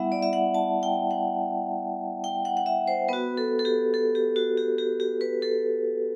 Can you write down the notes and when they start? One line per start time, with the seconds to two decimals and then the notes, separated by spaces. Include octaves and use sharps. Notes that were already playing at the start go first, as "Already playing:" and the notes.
Already playing: G3 B3 E4 E5 F#5
0.12 D5
0.23 E5
0.33 F#5
0.54 A5
0.83 G5
1.11 F#5
2.24 G5
2.45 F#5
2.57 F#5
2.66 E5
2.88 C5
3.08 B3 F#4 B4
3.37 A4
3.59 A4
3.65 G4
3.94 A4
4.15 G4
4.36 F#4
4.57 G4
4.78 G4
5.00 G4
5.21 B4
5.42 A4